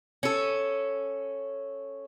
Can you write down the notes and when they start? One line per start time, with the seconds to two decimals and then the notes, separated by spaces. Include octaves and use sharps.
0.23 C#4 A4